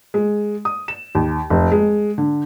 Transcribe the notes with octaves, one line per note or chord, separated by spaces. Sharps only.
G#3
D#6
E7
D#2
F1
G#3
D3